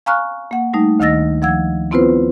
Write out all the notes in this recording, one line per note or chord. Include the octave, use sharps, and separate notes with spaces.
F5 G#5 A#5 C#6 F6 F#6
A#3 F#5
G3 A3 D#4
D2 D#3 D#5 E6 A6 A#6
F3 F#5 E6 G#6
B3 C4 E4 F4 B4 C5